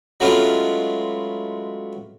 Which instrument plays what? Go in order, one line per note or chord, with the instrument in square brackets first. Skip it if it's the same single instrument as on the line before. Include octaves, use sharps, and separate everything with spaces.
[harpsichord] F#3 G#3 A3 B3 C#4 F4